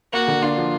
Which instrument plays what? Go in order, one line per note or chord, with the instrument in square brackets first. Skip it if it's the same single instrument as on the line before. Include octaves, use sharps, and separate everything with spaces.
[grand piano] A#3 [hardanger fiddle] F#4
[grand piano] D3
[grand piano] D4 [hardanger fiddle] F4
[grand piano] F3